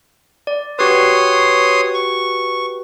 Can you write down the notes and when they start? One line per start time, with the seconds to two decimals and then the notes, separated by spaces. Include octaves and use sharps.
0.47 D5
0.79 F#4 G4 B4 C#5 C6 D#6
1.94 C#6